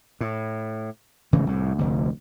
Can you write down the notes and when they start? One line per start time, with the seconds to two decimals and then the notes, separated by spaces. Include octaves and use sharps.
0.21 A2
1.33 G#1 C#3 E3 A3
1.47 C2 A2
1.79 F1 D2